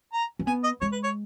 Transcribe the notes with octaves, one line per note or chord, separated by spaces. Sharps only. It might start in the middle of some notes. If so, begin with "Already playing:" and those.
A#5
C#4
B3 G#5
D#5
G#3 C#5
B4
C#5